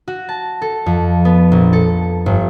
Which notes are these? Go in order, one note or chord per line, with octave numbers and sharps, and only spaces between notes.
F#4
A5
A4
F2
B3
A#1
A4
G1